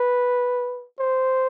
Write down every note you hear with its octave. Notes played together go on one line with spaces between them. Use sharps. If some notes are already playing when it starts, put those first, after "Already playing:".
Already playing: B4
C5